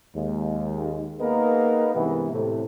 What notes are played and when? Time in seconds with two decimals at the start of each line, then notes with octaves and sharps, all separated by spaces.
0.15 D#2 G#3
1.20 A#3 B3 D#4 G#4 A#4 B4
1.94 G2 C3 E3 G#3 B3
2.32 A2 C3 A3